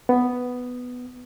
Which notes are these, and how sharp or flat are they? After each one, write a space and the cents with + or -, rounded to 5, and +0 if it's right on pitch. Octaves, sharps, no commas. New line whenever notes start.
B3 +5